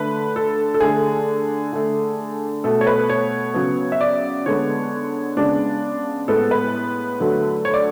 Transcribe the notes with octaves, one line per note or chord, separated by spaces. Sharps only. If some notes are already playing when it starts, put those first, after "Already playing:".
Already playing: D3 A3 B4
A4
A4
D3 A3 G#4
D3 A3
B2 A3 A4
C#5
B4
C#5
C#3 F#3 B3
E5
D5
D3 G#3 B3 C#5
C#3 G#3 B3 D4
A2 G#3 B3 A4
B4
D3 F#3 A3
C#5
D5